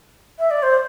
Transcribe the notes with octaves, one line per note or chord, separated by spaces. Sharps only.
E5
D5
C5